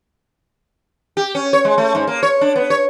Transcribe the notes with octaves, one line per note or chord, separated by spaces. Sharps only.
G4
C#4
C#5
G#3
A3
G#2
A#3
C#5
D4
B3
C#5